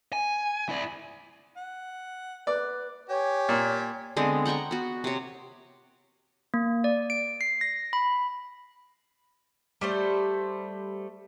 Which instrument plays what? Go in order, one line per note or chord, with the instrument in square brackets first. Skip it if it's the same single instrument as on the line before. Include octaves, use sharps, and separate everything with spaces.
[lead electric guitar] G#5
E4 D5
[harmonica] F#5
[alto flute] B4 [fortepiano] D5
[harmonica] G4 G#5 [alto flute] C#5
[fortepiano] A#2
[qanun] D3 G#3 B3 C4
F#5 G5 A#5 C#6
B3 F#4
C3 C#5
[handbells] A#3
D5
D7
C7
A#6
B5
[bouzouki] G3 A3 C5